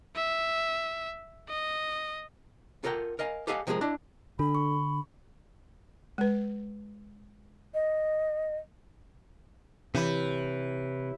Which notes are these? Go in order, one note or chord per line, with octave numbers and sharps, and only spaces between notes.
E5
D#5
F4 A4 A#4 F#5 G5
A#4 D#5 F5 G#5
G4 A4 D#5 F5 F#5 G#5
C3 F3 G#3 G4 G#4 A#4
D4 E4 D5 D#5
D3 D4 A4 B5
C#6
G#3 B4
D#5
C3 E3 G4 B4 C#5